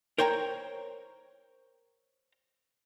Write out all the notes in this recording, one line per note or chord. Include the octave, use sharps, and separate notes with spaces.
A#4 C5 C#5 G5 A#5